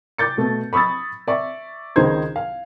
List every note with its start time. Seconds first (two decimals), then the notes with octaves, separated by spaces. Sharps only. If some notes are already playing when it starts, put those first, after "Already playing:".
0.18 D6 G6 A6 C#7
0.37 B2 A3
0.73 B5 C#6 D#6 E6 A6
1.28 D5 E5 C#6
1.96 C#2 D#3 D#4 C5 G#6
2.36 F5